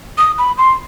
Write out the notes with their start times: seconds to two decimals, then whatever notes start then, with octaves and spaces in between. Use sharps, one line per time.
0.18 D#6
0.38 B5
0.58 C6